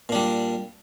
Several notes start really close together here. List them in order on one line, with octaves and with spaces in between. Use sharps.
A#2 D4 G3